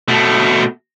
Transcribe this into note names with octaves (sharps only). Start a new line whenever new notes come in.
B2 A3